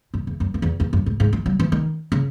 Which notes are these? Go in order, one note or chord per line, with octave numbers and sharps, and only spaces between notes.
F#2
E2
F#2
F#2
E2
E2
F#2
G#2
G#2
E3
F#3
E3
D#3
C#3